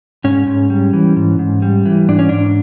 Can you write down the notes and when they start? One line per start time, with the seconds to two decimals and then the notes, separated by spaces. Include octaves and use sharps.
0.24 G#2 C#4
0.47 G#2
0.70 G3
0.93 E3
1.16 G#2
1.39 G#2
1.62 G3
1.85 E3
2.08 G#2 D4
2.19 C#4
2.29 G#2 D4